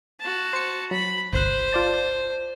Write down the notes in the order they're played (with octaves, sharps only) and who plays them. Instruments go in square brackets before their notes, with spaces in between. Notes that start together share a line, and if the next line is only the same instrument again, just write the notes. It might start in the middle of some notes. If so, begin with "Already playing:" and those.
[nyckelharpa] F#4 A5
[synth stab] C5 C#7
[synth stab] F#3 [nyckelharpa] B5
[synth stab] G1 C2 F#6 [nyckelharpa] C5
[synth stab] F4 D5 A5